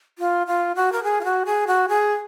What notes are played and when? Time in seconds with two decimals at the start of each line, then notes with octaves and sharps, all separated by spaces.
0.19 F4
0.47 F4
0.76 F#4
0.92 A#4
1.03 G#4
1.21 F4
1.25 F#4
1.46 G#4
1.67 F#4
1.89 G#4